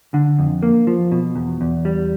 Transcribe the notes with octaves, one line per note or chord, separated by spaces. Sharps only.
D3
F2
A#3
F3
B2
E2
E2
G3